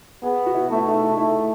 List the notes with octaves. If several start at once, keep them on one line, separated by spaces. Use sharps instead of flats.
B3 G#4
F#4
E4
A3 E4
D#4
D#4
A3 E4